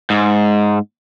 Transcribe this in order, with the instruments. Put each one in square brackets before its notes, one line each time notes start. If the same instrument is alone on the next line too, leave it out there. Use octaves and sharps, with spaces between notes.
[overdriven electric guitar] G#2